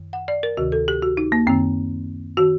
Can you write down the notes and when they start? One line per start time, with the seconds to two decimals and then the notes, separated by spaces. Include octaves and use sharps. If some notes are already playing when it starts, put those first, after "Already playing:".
Already playing: F#2 D#3
0.13 F#5
0.28 D5
0.43 A#4
0.57 D2 C3 D#3 F#4
0.72 A4
0.88 G4
1.02 F#4
1.17 D#4
1.32 A#3
1.47 F#2 D#3 C4
2.37 D#3 F#4